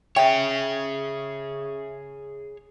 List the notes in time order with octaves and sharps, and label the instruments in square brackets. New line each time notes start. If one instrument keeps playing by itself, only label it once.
[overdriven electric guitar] G#4 C#5 [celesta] E5 [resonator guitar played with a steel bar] G5